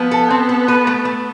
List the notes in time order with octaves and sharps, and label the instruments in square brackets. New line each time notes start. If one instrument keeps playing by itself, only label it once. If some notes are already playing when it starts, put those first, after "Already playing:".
Already playing: [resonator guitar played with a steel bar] F3 [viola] B3
[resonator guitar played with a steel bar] A4
C4
A4
B4
A3
A3